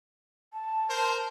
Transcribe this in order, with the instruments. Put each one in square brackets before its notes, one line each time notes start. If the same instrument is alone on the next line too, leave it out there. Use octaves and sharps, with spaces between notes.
[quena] A5
[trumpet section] A#4 C5